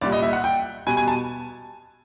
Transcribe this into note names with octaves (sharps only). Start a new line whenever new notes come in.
C2 A#2 G3 D5
D#5
E5
F#5
G5
B2 G3 B3 G#5
G#5
A5